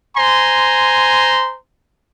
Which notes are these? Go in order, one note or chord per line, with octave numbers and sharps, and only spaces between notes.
C5 G#5 A#5 C6